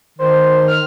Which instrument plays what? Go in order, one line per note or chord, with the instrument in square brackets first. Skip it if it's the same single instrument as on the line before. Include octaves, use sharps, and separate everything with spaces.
[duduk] D#3 [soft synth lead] C5
[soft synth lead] F6